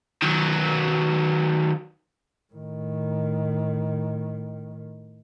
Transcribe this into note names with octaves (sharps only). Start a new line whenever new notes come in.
D#3 F#3
A2 D#3